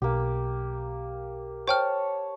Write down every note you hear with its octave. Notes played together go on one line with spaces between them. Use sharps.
B1 A#3 G4
C5 C#5 G5 A5 F6